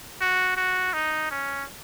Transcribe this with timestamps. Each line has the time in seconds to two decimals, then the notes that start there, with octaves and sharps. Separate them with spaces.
0.21 F#4
0.57 F#4
0.93 D#4
1.31 C#4